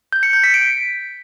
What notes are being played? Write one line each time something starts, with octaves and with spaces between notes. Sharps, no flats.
G6
C#7
G6
B6
D7